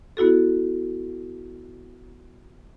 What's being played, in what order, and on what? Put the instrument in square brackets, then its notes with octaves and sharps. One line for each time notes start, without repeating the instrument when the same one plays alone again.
[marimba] B3 E4 F#4 A4